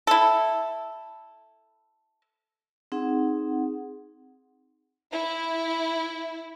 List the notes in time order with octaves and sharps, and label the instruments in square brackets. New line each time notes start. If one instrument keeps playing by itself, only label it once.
[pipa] E4 A4
[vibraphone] C4 D#4 G#4 F#5
[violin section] E4